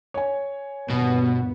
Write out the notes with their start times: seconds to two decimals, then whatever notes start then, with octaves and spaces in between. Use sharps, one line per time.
0.14 C#5 G#5
0.90 G1 D#2 B2 B3